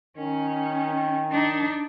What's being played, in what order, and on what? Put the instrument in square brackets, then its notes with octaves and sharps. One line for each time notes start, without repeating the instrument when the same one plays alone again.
[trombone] D#3 [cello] C#4
[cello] D4 D#4